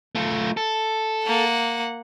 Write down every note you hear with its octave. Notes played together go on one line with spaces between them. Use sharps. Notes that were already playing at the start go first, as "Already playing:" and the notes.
A3 F4
A4
A#3 F#5